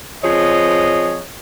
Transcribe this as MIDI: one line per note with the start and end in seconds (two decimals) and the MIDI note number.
0.24 1.22 53
0.24 1.22 60
0.24 1.22 68
0.24 1.22 73
0.24 1.22 75